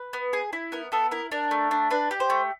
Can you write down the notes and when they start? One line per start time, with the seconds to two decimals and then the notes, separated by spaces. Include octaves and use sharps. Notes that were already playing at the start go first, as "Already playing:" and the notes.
Already playing: B4
0.13 B3
0.33 G#4
0.53 E4
0.72 B3 A#4
0.92 B3 A4
1.11 E4 A#4
1.32 D4 A#4
1.51 A3
1.71 D4
1.90 D4 B4
2.11 G4
2.20 C5
2.30 A3